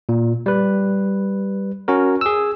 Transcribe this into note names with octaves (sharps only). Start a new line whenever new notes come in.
A#2
G3 B4
C#4 F#4 A#4
G#4 E6